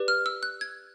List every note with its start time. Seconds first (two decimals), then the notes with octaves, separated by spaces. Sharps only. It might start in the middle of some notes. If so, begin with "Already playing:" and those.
Already playing: G4 B4 D5
0.08 F6
0.26 E6
0.43 F#6
0.61 G#6